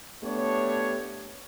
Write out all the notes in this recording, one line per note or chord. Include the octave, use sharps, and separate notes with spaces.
A3 B3 D4 G4 C#5